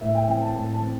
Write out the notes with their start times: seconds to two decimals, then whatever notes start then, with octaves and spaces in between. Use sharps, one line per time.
0.01 A2 E5
0.15 G5
0.28 E3 C4 G5
0.41 A5
0.55 A2 A5
0.73 A5
0.81 E3 C4